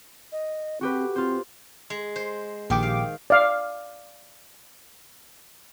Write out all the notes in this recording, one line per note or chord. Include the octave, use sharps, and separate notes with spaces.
D#5
C4 F#4 G4 B4
C4 F4 C5
G#3
C5
A#1 D#3 G4 D6
F5
D5 F5